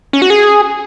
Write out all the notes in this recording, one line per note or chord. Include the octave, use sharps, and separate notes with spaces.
C#4
F#4
G#4